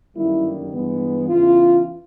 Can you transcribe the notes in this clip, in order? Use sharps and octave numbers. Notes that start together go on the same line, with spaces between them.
G1 F#2 D#3 G3 A#3 E4
G2 E3 G#3 B3
E2 C#3 E3 F4